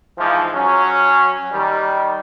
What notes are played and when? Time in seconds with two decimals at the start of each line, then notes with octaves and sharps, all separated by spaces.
0.19 G#2 E3 F3
0.55 F#3 C#4
1.53 D#3 G3